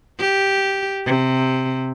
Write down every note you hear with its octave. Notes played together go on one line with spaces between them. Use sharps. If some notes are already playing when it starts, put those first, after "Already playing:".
G4
C3